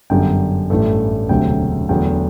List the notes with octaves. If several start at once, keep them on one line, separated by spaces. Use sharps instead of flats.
G1 F#2 D3 G3 G5
A1 G2 E3 A3
E1 D2 C3 F#3 A3 G5
E2 D3 F#3 A3 G5